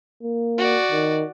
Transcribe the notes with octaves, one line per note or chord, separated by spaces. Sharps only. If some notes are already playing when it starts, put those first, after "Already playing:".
A#3
F#4 D5
D#3